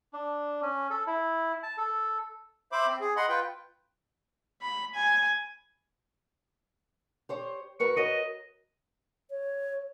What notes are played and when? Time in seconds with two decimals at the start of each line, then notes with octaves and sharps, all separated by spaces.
0.13 D4
0.62 C#4
0.90 A4
1.07 E4
1.63 A5
1.78 A4
2.72 C5 E5 B5 D6
2.87 C4
3.01 G#4
3.17 D#5 F#5 B5 C6
3.29 F4 B4 G5
4.62 B5
4.95 G#5
7.29 G4 C5 C#5
7.80 F#4 A#4 B4 C#6
7.96 F#4 A#4 C#5 D#5
9.30 C#5